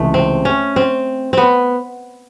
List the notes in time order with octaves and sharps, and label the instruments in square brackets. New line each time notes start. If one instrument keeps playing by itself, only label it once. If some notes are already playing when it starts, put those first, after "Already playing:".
Already playing: [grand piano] C#2 C3 E3 G#3 [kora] A3
[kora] C4
C#4
C4
B3 C4